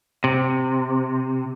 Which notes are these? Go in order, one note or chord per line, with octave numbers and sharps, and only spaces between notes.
C3